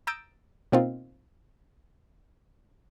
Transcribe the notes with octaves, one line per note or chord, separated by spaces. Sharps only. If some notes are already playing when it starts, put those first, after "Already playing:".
A#5 D#6 E6 G6 A6 D7
B2 A#3 C4 D#4 F4